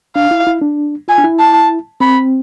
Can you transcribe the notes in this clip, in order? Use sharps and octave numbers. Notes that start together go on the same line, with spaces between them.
D4 F5
E4
E4
D4
F4 G#5
D4
E4
A5
C4 B5